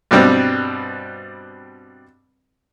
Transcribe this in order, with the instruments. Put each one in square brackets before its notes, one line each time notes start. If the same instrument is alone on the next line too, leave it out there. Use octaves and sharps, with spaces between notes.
[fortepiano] G2 B2 G3 C4